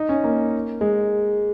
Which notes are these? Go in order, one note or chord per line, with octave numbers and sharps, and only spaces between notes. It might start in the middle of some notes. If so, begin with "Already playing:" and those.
Already playing: D#4
C#4
A#3
G#3